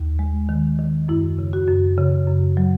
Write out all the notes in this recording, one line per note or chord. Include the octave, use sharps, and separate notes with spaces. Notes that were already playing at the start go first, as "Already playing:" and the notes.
Already playing: D#2
G#3
D#3
D#3
F#2 E4
C#3
F#4
F#2
C#3
F#2
F#3